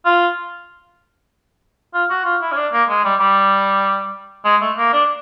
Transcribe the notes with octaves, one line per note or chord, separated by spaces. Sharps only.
F4
F4
F#4
F4
E4
C#4
D4
A#3
G#3
G3
G3
G#3
A3
A#3
D4